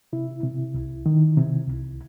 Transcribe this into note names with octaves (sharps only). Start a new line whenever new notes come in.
C3 E4
C3
C2
D#3
C3
C2